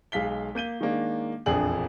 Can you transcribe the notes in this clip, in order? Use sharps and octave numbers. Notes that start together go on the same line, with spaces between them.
B1 G#3 F5 B6 G7
A#3 G6 D#7 G7
D#3 G#3 A#3 D4
E1 A#1 F2 D4 G#4 F#7